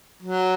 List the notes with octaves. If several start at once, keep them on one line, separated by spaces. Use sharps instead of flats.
F#3